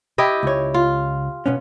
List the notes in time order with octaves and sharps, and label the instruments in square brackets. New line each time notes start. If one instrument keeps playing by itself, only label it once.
[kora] E4 G4 D#5
[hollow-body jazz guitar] C#2 C#5
[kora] F4
[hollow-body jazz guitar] B2 B3 C#4